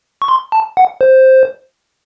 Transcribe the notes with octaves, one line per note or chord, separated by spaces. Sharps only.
C#6
C6
A5
F#5
C5